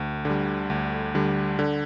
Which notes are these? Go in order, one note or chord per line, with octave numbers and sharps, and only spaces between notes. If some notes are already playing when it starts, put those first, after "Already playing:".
Already playing: D2
D3 G3
D2
D3 G3
D3